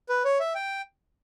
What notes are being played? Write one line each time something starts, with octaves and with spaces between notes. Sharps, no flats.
B4
C#5
E5
G5